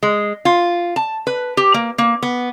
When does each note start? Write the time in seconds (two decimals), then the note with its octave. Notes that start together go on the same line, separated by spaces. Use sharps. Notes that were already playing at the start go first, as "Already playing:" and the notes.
0.03 G#3
0.45 F4
0.96 A5
1.27 B4
1.57 G4
1.74 A#3
1.98 A#3
2.23 B3